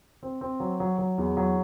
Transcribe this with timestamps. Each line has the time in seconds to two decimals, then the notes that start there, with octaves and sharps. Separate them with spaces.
0.23 C4
0.41 C4
0.60 F#3
0.80 F#3
0.98 F#3
1.18 E2
1.37 F#3